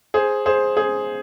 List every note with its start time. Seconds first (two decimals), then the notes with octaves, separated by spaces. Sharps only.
0.14 G#4 C5
0.46 G#4 C5
0.77 G#4 C5